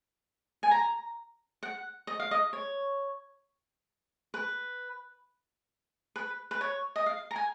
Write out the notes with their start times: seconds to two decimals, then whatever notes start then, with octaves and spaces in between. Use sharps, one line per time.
0.63 G#5
0.71 A#5
1.63 F#5
2.07 D#5
2.20 F5
2.31 D#5
2.53 C#5
4.34 B4
6.16 B4
6.51 B4
6.61 C#5
6.96 D#5
7.06 F5
7.31 A#5
7.36 G#5